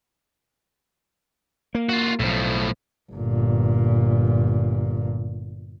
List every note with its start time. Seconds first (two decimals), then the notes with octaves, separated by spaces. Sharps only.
1.75 A#3
1.89 F4 F#4
2.20 B1 A2 F3
3.12 G1 A#2